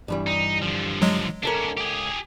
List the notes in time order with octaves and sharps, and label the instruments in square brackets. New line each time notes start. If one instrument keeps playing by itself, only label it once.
[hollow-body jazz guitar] G2 E3 G3
[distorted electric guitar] D#4
D3 F3
[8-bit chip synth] F#3 G#3
[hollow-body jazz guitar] C#2 A4 A#4 [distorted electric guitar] C#4 D4
[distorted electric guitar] G4 G#4